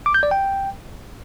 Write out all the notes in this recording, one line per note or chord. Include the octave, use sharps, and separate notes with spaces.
D6
G6
D5
G5